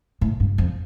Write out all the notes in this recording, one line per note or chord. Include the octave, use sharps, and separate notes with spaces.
A2
G2
F2